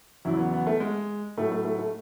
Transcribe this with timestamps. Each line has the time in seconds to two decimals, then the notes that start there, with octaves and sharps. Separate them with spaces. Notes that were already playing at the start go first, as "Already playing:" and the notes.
0.25 E2 C#3 F#3 E4
0.38 B3
0.53 B3
0.67 A3
0.80 G#3
1.37 A2 F#3 A3
1.52 A3
1.65 A3
1.79 A3